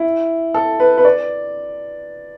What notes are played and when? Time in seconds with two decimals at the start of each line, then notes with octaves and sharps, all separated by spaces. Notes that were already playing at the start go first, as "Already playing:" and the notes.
Already playing: E4
0.54 A4
0.80 B4
0.98 B4
1.05 D5